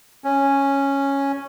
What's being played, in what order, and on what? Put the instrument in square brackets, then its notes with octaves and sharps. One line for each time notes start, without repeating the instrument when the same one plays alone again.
[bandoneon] C#4